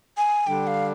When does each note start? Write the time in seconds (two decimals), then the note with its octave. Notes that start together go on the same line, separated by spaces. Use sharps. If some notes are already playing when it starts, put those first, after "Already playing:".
0.17 G#5
0.47 D3 G3 D4 G5
0.67 F5